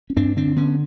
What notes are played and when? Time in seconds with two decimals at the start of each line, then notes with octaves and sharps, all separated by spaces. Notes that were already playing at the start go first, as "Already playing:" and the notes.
0.10 C#4
0.17 G2 C4 D4
0.37 D3 C4 D4
0.56 D3 B3 C#4